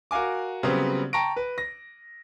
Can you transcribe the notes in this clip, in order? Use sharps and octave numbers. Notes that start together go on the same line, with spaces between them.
F#4 A#4 F5 G#5 D6
C#3 F#3 G3 B3 C4
G5 A5 A#5 C#6 A#6 D7
B4
A#6